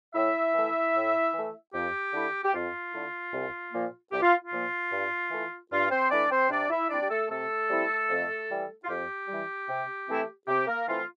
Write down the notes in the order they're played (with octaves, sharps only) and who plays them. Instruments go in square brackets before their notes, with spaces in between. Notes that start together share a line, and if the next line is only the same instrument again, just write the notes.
[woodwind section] A2 E4 E5
E3 A3
A2
E3 A3
F2 G4
D3 A3 E4
G4
F2 F4
D3 A3 E4
C2
A#2 F3 A#3
C2 G4
F4
F4
A#2 F3 A#3
G2
E3 A3 E4
G2 F4
C4 C5
E3 A3 D4 E4 D5
C4 C5
C3 D4 D5
E4 E5
G3 C4 D4 E4 D5
G4
A3 A4
C3 A3 A4
G3 C4 E4
F2
E3 G3
F4
F2 G4
E3 G3
C3
E3 A3 C4 E4
C3 G4
A#3 A#4
E3 A3 C4 E4 F4